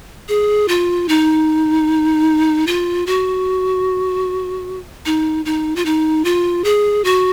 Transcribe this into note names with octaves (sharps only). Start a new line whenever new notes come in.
G#4
F4
D#4
F4
F#4
D#4
D#4
F4
D#4
F4
G#4
F#4